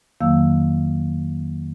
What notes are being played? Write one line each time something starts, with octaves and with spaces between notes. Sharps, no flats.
F2 D#3 F#3 A#3 F5 E6